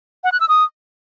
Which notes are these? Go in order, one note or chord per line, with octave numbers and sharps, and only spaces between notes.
F#5
F#6
E6
D#6